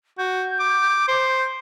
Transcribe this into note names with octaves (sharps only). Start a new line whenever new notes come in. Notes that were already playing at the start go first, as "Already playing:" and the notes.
F#4 G6
D6
C5